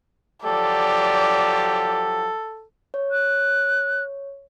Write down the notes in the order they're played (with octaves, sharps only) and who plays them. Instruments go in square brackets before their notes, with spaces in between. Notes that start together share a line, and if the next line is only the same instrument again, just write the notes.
[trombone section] F3 F#3 G4 [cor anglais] A4 [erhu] D5
[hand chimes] C#5
[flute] F#6